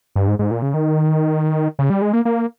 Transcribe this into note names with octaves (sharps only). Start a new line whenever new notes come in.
G2
G#2
G#2
A#2
C#3
D#3
C#3
G3
G#3
A#3
A#3